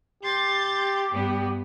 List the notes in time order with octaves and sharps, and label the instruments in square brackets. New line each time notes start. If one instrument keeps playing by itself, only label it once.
[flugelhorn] G4 [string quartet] C6 G6 A6
[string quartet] G2 B3